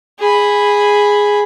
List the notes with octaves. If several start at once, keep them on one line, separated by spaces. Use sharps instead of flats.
G#4 B5